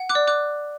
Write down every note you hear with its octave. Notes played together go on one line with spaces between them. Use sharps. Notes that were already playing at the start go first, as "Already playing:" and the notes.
Already playing: F#5
D6 F#6
D5
D6 F#6